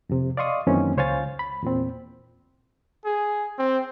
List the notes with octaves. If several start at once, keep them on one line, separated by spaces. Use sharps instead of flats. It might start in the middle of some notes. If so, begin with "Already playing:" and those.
F2 C3
D5 D#5 F5 C6 C#6 D#6
F#2 D#3 E3 A#3 C4 C#4
C#2 C5 C#5 F5 G#5 A6
B5
E2 A#2 C4
G#4
C4